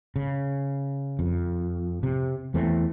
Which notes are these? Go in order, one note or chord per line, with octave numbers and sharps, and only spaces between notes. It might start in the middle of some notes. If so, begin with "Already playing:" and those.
C#3
F2
C3
E2 E3 A3 C4